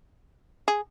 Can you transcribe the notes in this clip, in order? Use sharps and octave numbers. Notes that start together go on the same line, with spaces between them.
G#4